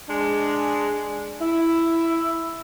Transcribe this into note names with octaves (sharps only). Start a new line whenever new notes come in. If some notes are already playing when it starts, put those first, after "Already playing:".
G#3 D4
E4